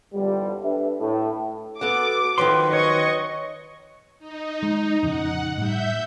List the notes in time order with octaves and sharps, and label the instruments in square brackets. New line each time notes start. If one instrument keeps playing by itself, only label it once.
[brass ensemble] G1 C2 D3 F3 G3
D4 G4 A4 B4 E5
A2
[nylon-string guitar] B3 F#4 F#5 [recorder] A4 [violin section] D6
[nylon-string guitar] D#3 F3 F#3 [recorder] B4 [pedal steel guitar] C6
[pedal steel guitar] C#5 [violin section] D#5 C#6
[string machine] D#4
[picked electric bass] G#3
[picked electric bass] A#1 F2 C#3 [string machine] F#5
[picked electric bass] A2 G3 [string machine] E5 G6